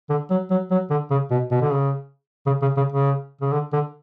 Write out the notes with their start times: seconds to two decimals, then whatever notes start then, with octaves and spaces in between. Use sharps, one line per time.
0.10 D3
0.30 F#3
0.50 F#3
0.71 F#3
0.91 D3
1.11 C#3
1.31 B2
1.51 B2
1.62 D3
1.72 C#3
2.47 C#3
2.62 C#3
2.77 C#3
2.92 C#3
3.41 C#3
3.52 D3
3.73 D3